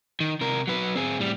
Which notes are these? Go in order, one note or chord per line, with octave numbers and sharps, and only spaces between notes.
D#3
C3 A#4
F#3 B4
C4 G#4
A2 G3